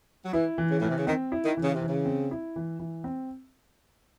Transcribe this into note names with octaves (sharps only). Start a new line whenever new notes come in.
F#3
E3 E4
E3
C#3
A2 E3
C3
C#3
D#3 C4
E4
D#3
E3
C#3
C3
E3
C#3
C4
E4
E3
E3
C4